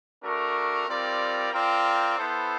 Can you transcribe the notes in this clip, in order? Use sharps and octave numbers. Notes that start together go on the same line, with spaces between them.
A3 D4 F#4 A#4
G3 C4 F4 A#4 D5
C4 F4 A#4 D5 G5
B3 E4 A4 C5